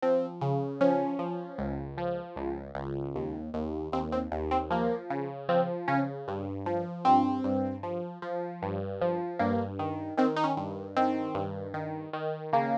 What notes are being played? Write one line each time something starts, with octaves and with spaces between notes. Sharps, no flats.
F3 C4
C#3
F3 C#4
F3
C#2
F3
C#2
C#2
D#2
D#2
D#2 C4
C4
D#2
C4
F3 A#3
C#3
F3 C4
C#3 C#4
G2
F3
G2 C4
G2
F3
F3
G2
F3
G2 A#3
D#3
D#3 C4
D#4
C#4
G2
D#3 C4
G2
D#3
D#3
C#3 A#3